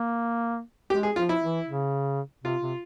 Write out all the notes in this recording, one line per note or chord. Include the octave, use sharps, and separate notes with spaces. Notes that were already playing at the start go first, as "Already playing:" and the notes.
Already playing: A#3
G#3 G4
G#4
F3 F4
E4
E3
C#3
C3 F4
C3